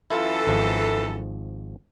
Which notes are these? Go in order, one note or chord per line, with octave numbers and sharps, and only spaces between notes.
F#2 E3 E4 F4 A4
G#1 G#2 F3